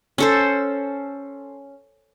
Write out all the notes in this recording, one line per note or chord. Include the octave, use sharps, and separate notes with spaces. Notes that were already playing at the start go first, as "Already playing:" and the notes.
C#4 A4 C5